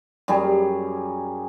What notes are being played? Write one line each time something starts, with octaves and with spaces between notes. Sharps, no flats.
F#2 G3 G4 G#4